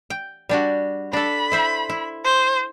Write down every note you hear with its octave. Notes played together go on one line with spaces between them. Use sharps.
G5
G3 D4 F#4
D4 A4 B5
E4 C5 E5
E4
C5